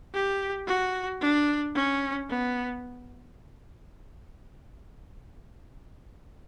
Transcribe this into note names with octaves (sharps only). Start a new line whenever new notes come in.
G4
F#4
D4
C#4
B3